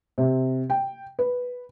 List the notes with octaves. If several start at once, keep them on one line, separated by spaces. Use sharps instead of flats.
C3
G5
B4